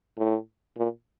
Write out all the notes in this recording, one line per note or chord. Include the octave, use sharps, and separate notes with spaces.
A2
A#2